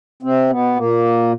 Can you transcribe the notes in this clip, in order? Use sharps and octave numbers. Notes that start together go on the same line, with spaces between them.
C3 C4
B2 B3
A#2 A#3